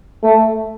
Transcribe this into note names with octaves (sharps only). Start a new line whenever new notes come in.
A3